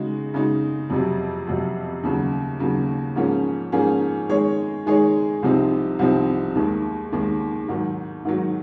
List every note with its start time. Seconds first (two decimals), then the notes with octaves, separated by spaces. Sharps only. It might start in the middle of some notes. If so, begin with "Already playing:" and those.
Already playing: C#3 G#3 D#4 F#4
0.34 C#3 G#3 D#4 F#4
0.90 F2 C3 F#3
1.47 F2 C3 F#3
2.03 D#2 C#3 F#3
2.59 D#2 C#3 F#3
3.16 G#2 F3 A#3 C#4 G#4
3.72 G#2 F3 A#3 C#4 G#4
4.29 D#3 G#3 D#4 G#4 C#5
4.86 D#3 G#3 D#4 G#4 C#5
5.42 C2 C3 F3 C4 D#4
5.99 C2 C3 F3 C4 D#4
6.55 D#2 D#3 G#3
7.12 D#2 D#3 G#3
7.68 G#2 D#3 F#3
8.25 G#2 D#3 F#3